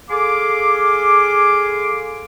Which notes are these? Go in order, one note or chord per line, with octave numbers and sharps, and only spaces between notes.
G#4 A4 F5 G#5 C6 D6